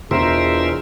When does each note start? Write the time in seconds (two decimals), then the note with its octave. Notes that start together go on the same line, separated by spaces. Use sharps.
0.11 E2 B2 D4 F4 G#4 A#4 C5 E5